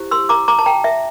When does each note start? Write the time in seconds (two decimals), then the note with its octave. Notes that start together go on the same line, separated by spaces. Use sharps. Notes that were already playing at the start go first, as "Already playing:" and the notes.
Already playing: E4 G4 C5
0.11 C6 E6
0.29 A#5 D6
0.48 A#5 D6
0.59 A5
0.66 G5 A#5
0.84 E5